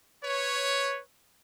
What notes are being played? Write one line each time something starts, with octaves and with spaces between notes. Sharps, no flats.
B4 C#5